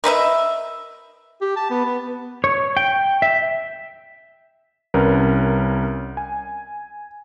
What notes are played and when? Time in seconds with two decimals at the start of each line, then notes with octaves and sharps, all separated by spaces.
0.04 A#4 B4 D#5 E5
1.41 G4
1.56 A5
1.70 B3
1.85 B3
2.44 C#5
2.77 G5
3.22 E5
4.94 C2 C#4 A#4 B4
6.17 G#5